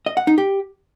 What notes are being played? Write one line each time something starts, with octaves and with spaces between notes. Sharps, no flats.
D#5
F#5
D#4
G4